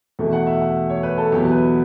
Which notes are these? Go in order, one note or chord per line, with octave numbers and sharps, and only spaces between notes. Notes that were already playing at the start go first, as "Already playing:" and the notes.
E2 B2 A3
F#5
E5
F#5
C#5
B4
A4
E2 B2 F#3 B3 G4
B4